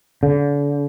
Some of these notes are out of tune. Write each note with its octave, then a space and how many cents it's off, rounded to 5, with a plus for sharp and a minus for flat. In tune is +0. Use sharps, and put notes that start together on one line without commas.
D3 -35